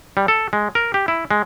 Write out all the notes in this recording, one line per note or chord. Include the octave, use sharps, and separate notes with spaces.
G3
A4
G#3
A#4
G4
E4
G#3